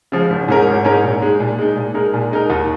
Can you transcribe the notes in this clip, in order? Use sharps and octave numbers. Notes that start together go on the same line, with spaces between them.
C#3 F3 G#3
G#1
G#2 G#3 C#4 A#4
G#1
G#2 G#3 C#4 A#4
A#2
G#3 D#4
A#2
G#3 D#4
A#2
G#3 D#4 A#4
A#2
G#3 D#4 A#4
D#2